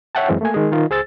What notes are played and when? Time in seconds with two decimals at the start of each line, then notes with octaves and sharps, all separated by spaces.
0.15 C#5 E5 F#5 G5 A5
0.28 F#2 E3 G#3 C4 C#4
0.41 A3 A#3 G#5
0.54 D#3 G#3 G#4
0.72 D#3 F4
0.90 C#2 G#4 C5 E6 A6